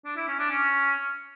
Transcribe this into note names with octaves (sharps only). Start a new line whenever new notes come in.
D4
E4
C#4
D4
C#4